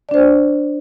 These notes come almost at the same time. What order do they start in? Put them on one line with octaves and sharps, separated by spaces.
D5 D4 C5